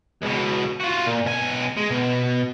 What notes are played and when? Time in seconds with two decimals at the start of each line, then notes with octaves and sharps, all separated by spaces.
0.22 C#2 B2
0.80 F4 F#4
1.06 A#2
1.25 B1 G#5
1.77 G#3
1.90 B2